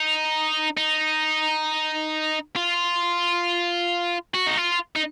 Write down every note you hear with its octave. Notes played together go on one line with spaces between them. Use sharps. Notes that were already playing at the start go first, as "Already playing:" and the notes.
Already playing: D#4
D#4
F4
F#4
D#4
F4
D#4